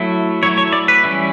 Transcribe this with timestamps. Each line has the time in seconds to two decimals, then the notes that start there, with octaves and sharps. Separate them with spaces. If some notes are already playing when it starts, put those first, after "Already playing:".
Already playing: F#3 A3 E4
0.43 F#3 A3 E4 C#5
0.58 C#5
0.73 D5
0.88 B4
1.03 E3 G3 C#4 E4